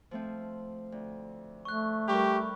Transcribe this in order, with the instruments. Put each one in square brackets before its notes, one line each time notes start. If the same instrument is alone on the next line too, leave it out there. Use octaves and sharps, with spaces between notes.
[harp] F3 A3 C4
D2
[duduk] A3 [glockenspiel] C#6 F#6
[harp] G3 A#4 [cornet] G4 [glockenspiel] B5 C#6